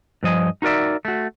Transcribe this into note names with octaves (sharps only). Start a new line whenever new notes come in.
G2 F3 D#5 G#5
D#4 F#4 A#4 D5 E5
A3 F#4